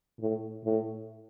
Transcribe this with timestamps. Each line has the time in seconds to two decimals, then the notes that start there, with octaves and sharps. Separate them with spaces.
0.20 A2
0.65 A2